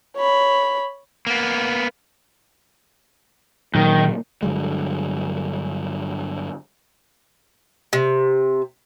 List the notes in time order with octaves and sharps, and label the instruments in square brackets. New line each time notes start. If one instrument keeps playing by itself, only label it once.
[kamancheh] C#5 B5
[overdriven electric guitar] A#3 B3
[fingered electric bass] A#2 F#3 A#3 [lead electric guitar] D#3
[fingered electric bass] G2 D3 F#3 G#3
[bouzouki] C3